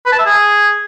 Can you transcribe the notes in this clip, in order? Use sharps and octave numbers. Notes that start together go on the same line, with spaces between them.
B4
A5
E5
G#4